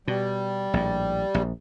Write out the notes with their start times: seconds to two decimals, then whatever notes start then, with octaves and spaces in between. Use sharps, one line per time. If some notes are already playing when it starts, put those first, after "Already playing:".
0.08 B2 G3
0.73 A#1 A2
1.34 A#1